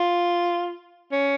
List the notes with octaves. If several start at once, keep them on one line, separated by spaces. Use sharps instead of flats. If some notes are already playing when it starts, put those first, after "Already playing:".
Already playing: F4
C#4